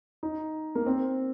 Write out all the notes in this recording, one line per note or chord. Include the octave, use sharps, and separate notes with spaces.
D#4
A#3
C4